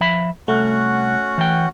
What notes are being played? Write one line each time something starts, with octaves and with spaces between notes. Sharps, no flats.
F3 E5 B5
C2 A3 C#4 F#4 F#5
E3 G5